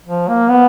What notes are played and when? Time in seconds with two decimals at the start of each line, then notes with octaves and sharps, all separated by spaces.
0.06 F3
0.28 A#3
0.49 B3